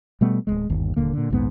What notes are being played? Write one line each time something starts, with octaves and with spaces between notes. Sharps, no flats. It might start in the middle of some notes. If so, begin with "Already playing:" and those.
B2 G3 A3 B3
D1 G1 G#3
G1 D#2
D#1 D#2 D3 A#3
A#2 D3
A#1 D#2 G#2 B3